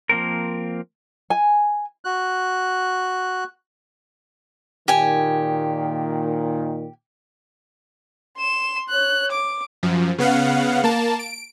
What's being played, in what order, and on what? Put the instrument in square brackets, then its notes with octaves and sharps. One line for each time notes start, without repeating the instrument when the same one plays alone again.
[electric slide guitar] F3 A#3 C4 A#4
[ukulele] G#5
[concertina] F#4 F#6
[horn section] A#2 D#3 [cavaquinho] G4 G#5
[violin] C6 E7
C#5 F#6
D6
[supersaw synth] F#2 F3
C#3 B3 F5 F#5
A#3 A5
D7